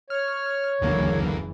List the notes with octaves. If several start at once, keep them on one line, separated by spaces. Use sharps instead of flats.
C#5 F6
F#1 D2 D3 E3 A#3